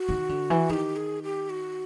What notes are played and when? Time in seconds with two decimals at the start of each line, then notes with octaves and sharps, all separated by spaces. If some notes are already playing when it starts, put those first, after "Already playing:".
Already playing: F#4
0.09 D#3
0.29 D3
0.50 E3
0.69 D#3 G#4
0.73 G4
0.96 G#4
1.23 G4
1.50 F#4